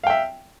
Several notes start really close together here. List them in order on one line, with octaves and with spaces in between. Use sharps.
F5 G5 E5